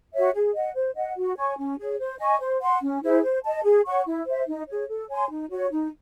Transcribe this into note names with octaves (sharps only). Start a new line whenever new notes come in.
F#4 C#5 E5
G#4
D#5 F#5
C5
D#5 F#5
F#4
C#5 G#5 C#6
C#4
G#4 C#5
C5
D#5 G#5 C#6
C5
F#5 C6
C#4
E4 G#4 C5
C5
D#5 A5
G#4
C#5 F#5 C#6
E4
C5 E5
D#4
G#4 C#5
A4
C#5 G#5 C6
D#4
F#4 C#5
D#4